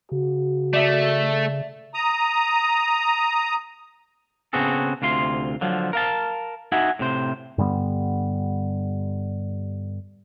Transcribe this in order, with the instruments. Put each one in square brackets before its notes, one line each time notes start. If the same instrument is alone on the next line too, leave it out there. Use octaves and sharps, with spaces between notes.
[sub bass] C#3 [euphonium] F#4
[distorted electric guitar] A3 [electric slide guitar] D5 E5
[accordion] A#5 D#6
[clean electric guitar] C#3 B3 C4 F#4 G#4 A4
D2 C3 F4 C6
D3 F3 F#3
A#4 F5 A5
D#4 F#4 E5 F#5 G#5
A2 C3 C5
[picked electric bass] G2 D3 G3 B3